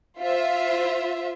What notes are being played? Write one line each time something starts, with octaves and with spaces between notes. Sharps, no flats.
F4 C5 E5